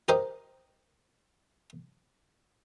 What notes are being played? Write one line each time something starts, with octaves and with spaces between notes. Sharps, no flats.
G4 A#4 C5 D#5 G5